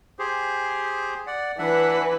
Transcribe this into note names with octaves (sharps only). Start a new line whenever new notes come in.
G4 G#4 C5
D5 F#5
E3 D4 B4 E5 F#5